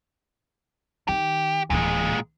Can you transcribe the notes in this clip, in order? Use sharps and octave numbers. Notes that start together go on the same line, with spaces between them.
D#3 G4
D1 A#2 E3 G#3